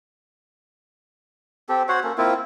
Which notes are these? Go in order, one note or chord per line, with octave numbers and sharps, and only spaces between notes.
C4 G4 A4
F#4 C5 C#5 F#5
A#3 C#4 A4
A#3 C4 E4 F4